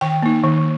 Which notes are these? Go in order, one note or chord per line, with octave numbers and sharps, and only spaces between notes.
D#3 G5
A#3 D#4
D#3